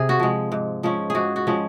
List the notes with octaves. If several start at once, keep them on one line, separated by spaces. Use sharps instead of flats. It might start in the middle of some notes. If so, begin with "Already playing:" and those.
Already playing: C3 G#4
F#4
F3 G#3
G#2
F3 G#3 C#4
G#2 F#4 G#4
F#4
F3 G#3 C#4